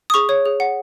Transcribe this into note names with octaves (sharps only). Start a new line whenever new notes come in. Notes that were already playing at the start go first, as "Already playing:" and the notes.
D#6
G#4 C#6
C#5
G#4
F#5